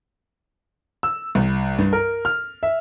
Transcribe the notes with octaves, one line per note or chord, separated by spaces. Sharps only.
E6
C2
G2
A#4
F6
E5